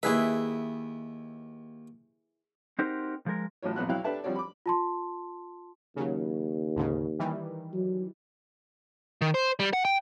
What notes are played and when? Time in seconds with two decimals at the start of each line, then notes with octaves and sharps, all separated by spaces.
0.03 D#2 E4 G#4 B4 E5
2.79 C4 D#4 F#4 G4 A#4 C5
3.26 F3 G#3 A#4
3.63 A1 A2 F#3 F4 C#5
3.76 A#1 F2 B3 F#6
3.89 B1 F#3 E4 F5 G5 F#6
4.04 D4 G4 A4 B4 E5 A5
4.24 F3 G3 C4 F#4 C#5 D5
4.36 B5 D6
4.66 F4 A5 C6
5.96 D#2 C#3 F#3
6.76 D2 G#2 C#3
7.19 D#3 E3 G3
7.73 F#3
9.21 D#3
9.35 C5
9.60 G3
9.73 F#5
9.85 G5